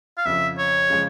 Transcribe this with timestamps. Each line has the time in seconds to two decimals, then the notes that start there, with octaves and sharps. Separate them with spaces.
0.18 F5
0.25 F2 C#3 F3 E5
0.58 C#5
0.90 C#3 F3 G#3